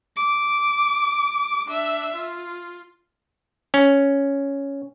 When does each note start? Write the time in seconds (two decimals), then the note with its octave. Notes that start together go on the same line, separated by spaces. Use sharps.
0.16 D6
1.67 D4 E5
2.14 F4
3.74 C#4